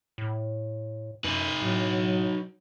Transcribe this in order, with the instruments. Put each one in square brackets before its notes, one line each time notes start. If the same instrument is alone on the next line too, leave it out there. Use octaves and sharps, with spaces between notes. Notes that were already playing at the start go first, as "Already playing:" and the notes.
[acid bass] A2
[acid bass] F#2 [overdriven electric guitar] D#4 B4
[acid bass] A2 [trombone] F#3